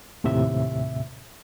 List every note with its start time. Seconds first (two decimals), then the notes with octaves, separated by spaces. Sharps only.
0.24 D#2 A2 C3 E5